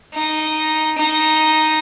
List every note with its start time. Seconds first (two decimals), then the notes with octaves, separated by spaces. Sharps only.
0.15 D#4
0.98 D#4